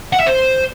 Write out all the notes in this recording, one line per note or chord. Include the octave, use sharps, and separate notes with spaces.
F#5
E5
C5